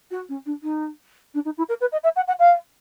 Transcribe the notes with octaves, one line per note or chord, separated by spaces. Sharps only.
F#4
C#4
D4
D#4
D4
D#4
E4
A#4
B4
D#5
E5
F#5
F#5
F5